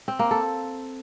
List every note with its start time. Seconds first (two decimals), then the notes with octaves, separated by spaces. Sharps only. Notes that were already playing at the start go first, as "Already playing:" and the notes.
0.08 C4
0.19 A#3
0.31 A4